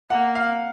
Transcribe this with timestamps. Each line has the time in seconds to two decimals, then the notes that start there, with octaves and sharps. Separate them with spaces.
0.10 A#3 F#5
0.35 F5